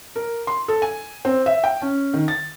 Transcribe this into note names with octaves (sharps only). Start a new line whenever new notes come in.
A#4
C6
A4
G#5
C4
E5
G5
C#4
D#3
A6